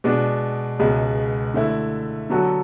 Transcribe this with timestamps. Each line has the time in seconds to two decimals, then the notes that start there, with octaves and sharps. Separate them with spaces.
0.04 B2 G#3 B3 D4
0.79 C#2 B2 G#3 B3
1.54 D3 A3 E4
2.30 D3 F#3 B3 F#4 A4